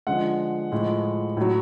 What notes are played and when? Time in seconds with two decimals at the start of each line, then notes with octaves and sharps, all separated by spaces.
0.07 D3 F3 G#3 F#5
0.72 A2 F3 G#3
1.37 A2 F#3